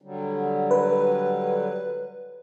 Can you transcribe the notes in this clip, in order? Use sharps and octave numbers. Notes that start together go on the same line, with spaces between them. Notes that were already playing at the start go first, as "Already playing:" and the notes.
D3 F#3 G3
B4